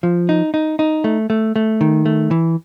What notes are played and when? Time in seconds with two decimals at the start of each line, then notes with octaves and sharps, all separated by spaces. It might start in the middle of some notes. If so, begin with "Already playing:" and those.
0.03 F3
0.29 D#4
0.54 D#4
0.79 D#4
1.04 A3
1.30 A3
1.56 A3
1.81 D#3
2.06 A3
2.31 E3